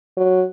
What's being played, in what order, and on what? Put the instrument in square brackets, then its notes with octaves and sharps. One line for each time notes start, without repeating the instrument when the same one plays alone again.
[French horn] F#3